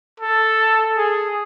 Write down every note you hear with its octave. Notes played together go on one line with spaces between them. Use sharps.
A4
G#4